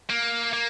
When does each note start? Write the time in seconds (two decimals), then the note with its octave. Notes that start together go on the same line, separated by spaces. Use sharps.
0.10 A#3
0.53 A#3